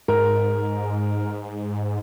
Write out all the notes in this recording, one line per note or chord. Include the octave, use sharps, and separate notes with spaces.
G#2 A#4